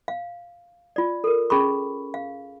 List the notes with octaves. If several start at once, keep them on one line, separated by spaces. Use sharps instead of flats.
F5
F4 D5
A4 A#4
C#4 G#4 B5 C#6
F5